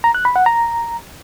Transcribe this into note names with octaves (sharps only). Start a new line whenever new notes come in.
A#5
F#6
B5
F#5
A#5